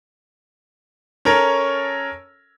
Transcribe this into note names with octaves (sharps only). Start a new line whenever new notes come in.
C#4 A4 A#4 C#5